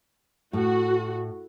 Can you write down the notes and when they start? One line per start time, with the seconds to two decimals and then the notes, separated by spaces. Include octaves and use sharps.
0.53 A2 F#4